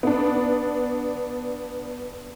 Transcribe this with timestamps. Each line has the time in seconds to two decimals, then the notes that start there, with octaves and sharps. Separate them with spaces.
0.03 B3 D4